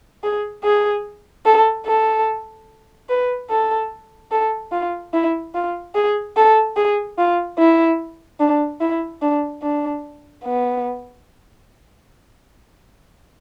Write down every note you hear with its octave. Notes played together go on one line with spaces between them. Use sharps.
G#4
G#4
A4
A4
B4
A4
A4
F4
E4
F4
G#4
A4
G#4
F4
E4
D4
E4
D4
D4
B3